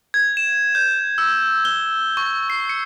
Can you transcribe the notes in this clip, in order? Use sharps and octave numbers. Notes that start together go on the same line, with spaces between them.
G#6
E7
G6
E6
G7
C#6
C7
C#7